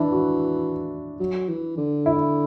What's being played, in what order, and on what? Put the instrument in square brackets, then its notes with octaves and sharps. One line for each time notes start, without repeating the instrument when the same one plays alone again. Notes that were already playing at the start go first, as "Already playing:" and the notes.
Already playing: [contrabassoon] E3 [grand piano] D4 E4
[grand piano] F#4
[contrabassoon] F#3
E3
D3
[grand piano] E4